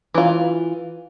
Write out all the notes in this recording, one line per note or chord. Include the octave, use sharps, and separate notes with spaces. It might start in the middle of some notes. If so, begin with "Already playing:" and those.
E3 F4